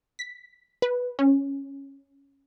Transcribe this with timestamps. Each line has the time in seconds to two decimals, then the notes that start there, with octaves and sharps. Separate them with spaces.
0.19 B6
0.82 B4
1.19 C#4